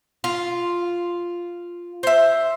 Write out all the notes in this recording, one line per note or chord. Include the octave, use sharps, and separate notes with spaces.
F4
C5 E5